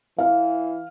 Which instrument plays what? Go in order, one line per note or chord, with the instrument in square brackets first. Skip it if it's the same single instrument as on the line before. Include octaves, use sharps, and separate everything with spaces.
[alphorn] E3 [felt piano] F5